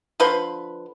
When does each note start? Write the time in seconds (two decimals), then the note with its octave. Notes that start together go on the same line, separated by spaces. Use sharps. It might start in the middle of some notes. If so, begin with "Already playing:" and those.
0.20 D3 F3 B4 C6